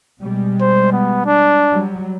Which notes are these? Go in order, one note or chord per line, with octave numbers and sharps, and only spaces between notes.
B2 G3 G#3
C5
B3
D4
F#3 G3